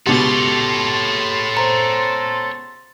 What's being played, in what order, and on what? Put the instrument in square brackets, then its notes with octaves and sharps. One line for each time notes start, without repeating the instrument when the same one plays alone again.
[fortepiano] C#2 B2 [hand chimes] G4 D6 [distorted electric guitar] A4 C#5 [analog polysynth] C6 A6
[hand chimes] C5 A#5 C#7